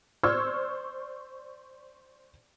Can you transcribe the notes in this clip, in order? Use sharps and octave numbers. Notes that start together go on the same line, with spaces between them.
C5 D5 C#6 E6 F6 G#6